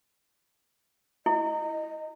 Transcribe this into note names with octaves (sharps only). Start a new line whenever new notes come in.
E4 D#5